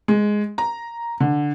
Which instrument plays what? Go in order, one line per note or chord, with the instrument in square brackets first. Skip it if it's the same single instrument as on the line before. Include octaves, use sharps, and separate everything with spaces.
[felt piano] G#3
A#5
D3